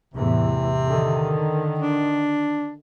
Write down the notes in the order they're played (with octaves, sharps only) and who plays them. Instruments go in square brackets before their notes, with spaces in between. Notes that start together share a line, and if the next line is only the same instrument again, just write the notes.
[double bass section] E2 A2 E3 [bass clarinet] C3
[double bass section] D3 D#3
[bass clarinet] D4